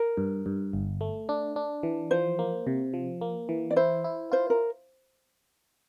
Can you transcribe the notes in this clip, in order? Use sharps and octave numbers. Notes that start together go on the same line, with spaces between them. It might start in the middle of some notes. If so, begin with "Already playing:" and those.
Already playing: A#4
G2
G2
G1
A3
D4
D4
E3
F3 C5
A#3
C3
F3
A#3
E3
D5
E4 C5
E4
F4 C5
A#4